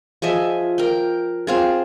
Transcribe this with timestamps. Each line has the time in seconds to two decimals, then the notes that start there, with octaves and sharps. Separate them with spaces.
0.22 F3 G#4 D#5 E5
0.78 A#4 G5
1.47 C4 F4 G#4